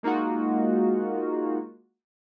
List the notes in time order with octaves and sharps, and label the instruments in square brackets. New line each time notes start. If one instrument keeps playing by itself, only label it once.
[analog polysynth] G#3 A#3 D#4 F4 F#4